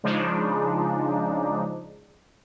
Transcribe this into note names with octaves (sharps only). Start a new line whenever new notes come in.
C#3 F3 G#3 D4 D#4